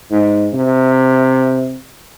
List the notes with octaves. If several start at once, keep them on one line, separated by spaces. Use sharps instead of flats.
G#2
C3